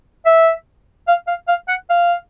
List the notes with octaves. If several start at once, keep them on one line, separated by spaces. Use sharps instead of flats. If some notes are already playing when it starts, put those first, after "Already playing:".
E5
F5
F5
F5
F#5
F5